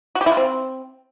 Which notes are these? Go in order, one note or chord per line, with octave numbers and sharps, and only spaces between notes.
F#4
G4
E4
F4
C4